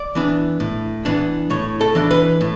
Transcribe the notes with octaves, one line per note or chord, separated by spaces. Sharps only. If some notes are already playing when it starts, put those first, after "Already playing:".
Already playing: D5
E3 B3 D4
A2
E3 B3 D4
A2 C#5
A4
E3 B3 D4
B4
A2